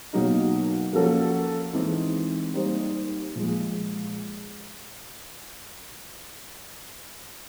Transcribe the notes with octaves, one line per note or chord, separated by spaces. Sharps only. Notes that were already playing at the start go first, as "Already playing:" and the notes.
B2 F#3 A#3 D#4
F3 A#3 C#4 F#4 A4
E3 G#3 C4 D#4
G3 A#3 D#4 G4 C5
A#2 F3 G#3